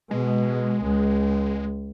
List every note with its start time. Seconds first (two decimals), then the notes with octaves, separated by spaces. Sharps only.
0.11 B2 G#3
0.82 C#2